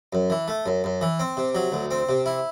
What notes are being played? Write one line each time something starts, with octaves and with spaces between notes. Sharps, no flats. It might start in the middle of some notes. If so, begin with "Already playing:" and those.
F#2
E3
A3
F#2
F#2
E3
C4
C3
F#3
D2
C4
C3
E4